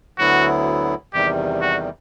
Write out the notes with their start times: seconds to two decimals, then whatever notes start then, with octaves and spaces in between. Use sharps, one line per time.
0.18 D2 D3 F#3 B3 E4 F#4
1.13 E2 C3 D#3 G3 G4
1.61 F#4